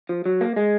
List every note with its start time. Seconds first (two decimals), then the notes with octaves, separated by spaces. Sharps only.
0.09 F3
0.26 F#3
0.41 A#3
0.56 G#3